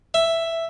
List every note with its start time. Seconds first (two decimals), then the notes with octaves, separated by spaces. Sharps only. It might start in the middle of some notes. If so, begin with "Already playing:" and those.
0.14 E5